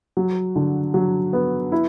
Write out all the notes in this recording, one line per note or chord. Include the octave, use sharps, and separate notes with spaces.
F#3
D3
F#3
B3
E4